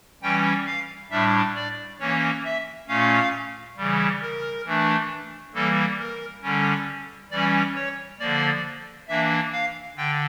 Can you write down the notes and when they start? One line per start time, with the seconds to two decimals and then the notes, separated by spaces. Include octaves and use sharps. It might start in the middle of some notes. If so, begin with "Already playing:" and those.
0.22 E3 G3 C#4 G5
0.66 F5
1.10 A2 G3 D4 E5
1.55 D5
1.99 E3 A#3 C#4 C#5
2.44 E5
2.88 A#2 A3 C#4 F5
3.77 C#3 E3 G3
4.22 A#4
4.65 E3 A3 D4
5.54 E3 G3 A#3 A4
5.99 A#4
6.43 D3 G3 C#4
7.31 E3 G3 C#4 D5
7.75 C#5
8.19 D3 F3 A#3 D5
9.08 E3 A#3 D4 E5
9.53 F5
9.97 D3 G5